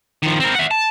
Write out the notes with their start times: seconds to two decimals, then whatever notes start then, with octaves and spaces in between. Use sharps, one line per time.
0.23 D#3 F3
0.40 C4 A#4
0.55 E5 F#5
0.71 A5